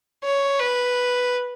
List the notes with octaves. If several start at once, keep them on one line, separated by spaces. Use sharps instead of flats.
C#5
B4